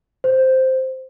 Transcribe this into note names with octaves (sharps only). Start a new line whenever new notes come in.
C5